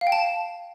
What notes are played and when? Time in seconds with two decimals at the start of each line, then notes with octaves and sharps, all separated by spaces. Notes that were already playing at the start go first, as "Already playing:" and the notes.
0.01 F5
0.07 G5
0.12 A5